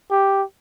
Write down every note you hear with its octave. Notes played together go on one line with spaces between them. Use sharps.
G4